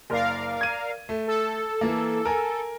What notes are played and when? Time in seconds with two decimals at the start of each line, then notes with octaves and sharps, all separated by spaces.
0.10 F#1 A#4 D5 F5
0.61 G#6 D#7
1.09 A3
1.27 A4
1.81 E3 A#3
2.25 A#4 G#5